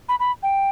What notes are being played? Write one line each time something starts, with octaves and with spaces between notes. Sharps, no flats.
B5
B5
G5